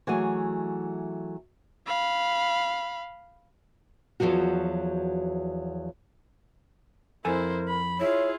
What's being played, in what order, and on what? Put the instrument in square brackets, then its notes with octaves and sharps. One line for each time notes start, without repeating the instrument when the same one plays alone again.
[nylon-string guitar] E3 F#3 A3 G#4 D#5 G#5
[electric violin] F5 B5
[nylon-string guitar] E2 A2 F3 F#3 F#4
[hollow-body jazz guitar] F2 A4 G#5 [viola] E4 C5 [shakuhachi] A#4
[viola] B5
[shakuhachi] E4 [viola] F4 G#4 [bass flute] C#5